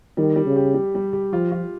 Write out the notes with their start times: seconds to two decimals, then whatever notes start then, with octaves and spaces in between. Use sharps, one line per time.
0.17 D#3 G3
0.36 G3
0.46 C#3
0.56 G4
0.74 G3
0.95 G3
1.13 G4
1.32 F3 F4
1.52 F4